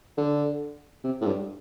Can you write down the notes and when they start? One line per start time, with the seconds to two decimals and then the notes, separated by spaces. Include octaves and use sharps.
0.17 D3
1.04 C3
1.21 A2
1.25 G2